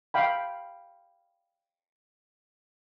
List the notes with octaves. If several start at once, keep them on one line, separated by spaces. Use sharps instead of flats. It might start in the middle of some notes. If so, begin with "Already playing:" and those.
F5 G5 B5